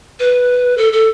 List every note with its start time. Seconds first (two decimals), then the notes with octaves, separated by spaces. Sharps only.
0.20 B4
0.78 A4
0.93 A4